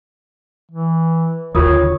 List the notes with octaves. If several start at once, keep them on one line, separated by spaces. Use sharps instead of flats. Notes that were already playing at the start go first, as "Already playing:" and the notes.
E3
D#2 D3 F4 A#4 C#5 D#6